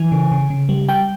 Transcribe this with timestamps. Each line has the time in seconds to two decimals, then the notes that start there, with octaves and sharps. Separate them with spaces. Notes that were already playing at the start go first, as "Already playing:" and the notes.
Already playing: E3 G#5
0.12 C#3
0.32 C#3
0.50 C#3
0.69 G3
0.89 G3 G5